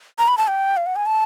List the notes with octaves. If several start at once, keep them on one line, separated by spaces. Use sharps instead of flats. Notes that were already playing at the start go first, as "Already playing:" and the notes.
A#5
B5
A5
G5
F5
F#5
G#5
A5